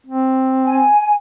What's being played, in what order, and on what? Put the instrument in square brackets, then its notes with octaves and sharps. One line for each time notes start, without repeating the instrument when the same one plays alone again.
[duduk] C4
[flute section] G#5